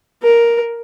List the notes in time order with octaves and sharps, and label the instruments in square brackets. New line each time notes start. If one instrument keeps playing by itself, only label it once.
[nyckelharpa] A#4